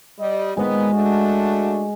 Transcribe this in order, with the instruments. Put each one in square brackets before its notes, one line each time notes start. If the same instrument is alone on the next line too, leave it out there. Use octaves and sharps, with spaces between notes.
[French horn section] G3 D#5
[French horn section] A#2 D#3 B3 [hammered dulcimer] G#3 D#5
[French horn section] A3 D4 F#4